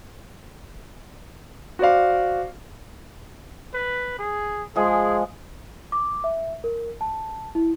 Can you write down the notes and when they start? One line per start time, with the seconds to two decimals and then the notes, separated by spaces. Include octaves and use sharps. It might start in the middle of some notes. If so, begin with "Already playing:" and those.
1.79 F#4 C5 D5 F5
3.74 B4
4.18 G#4
4.76 F3 G#3 G#4
5.92 D6
6.24 E5
6.64 A#4
7.01 A5
7.55 E4